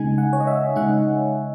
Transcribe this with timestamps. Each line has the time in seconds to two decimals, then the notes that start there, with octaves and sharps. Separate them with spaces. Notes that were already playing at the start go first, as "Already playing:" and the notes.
Already playing: C#3 G#3 D#4 G#5
0.18 F#5
0.33 C#5
0.40 D#5
0.47 E5
0.76 C#3 G#3 D#4 F#5